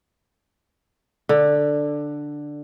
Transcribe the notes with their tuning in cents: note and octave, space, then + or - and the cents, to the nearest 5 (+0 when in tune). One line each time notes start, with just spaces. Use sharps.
D3 +5